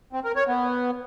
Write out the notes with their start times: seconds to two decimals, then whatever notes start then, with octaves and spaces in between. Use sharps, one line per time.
0.13 C4
0.24 A#4
0.36 C#5
0.47 B3